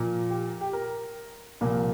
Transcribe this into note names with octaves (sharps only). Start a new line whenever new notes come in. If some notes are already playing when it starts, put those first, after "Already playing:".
Already playing: A#2 F3 A#3
G4
G4
A#4
C2 A#2 F3 A#3